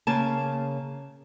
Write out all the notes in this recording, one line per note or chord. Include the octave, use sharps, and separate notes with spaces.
C#3 A#3 G#5 A5